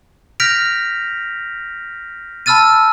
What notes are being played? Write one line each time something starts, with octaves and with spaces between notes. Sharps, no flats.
F6 G6 A#6 B6 D7 F7
A5 B5 E6 F6 A6 D#7